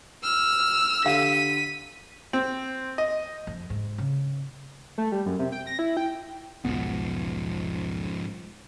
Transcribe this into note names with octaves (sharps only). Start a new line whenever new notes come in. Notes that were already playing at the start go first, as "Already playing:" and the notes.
E6 F6
D3 G4 F5 B6 D#7
C4
D#5
F2
G#2
C#3
A3
G3
F#2
C3
G5
A#6
E4
G5
E1 B1 G#2 F3 B3